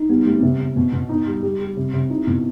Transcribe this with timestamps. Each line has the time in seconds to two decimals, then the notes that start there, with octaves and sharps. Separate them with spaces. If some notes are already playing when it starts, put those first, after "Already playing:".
Already playing: D#4
0.09 G3 B3
0.25 G3 A3
0.37 C4
0.42 C3 B3
0.59 C3
0.76 B2 B3
0.93 B2
1.09 D#4
1.27 G3
1.43 G3 G4
1.60 G3
1.77 C3
1.93 C3
2.10 D#4 E4
2.27 B2